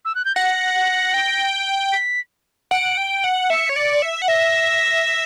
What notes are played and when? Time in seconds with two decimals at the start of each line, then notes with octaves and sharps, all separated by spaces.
0.05 E6
0.15 F#6
0.25 G6
0.36 F#5 A#6
1.14 G5
1.93 B6
2.71 F#5 D7
2.98 G5
3.24 F#5
3.50 E5 C#7
3.69 C#5
3.76 D5
4.02 E5
4.22 F#5
4.28 E5 A#6